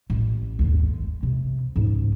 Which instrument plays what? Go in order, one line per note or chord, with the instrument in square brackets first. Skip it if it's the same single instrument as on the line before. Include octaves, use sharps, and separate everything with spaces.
[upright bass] A1
G1 D#2
G#3
C3
C#2 G#2